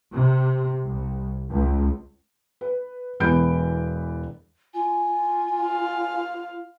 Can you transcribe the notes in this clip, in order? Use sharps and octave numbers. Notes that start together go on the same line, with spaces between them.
C3
C2
C#2
B4
E1 E3 B3 B5 G6 D7
F4 G#5
F5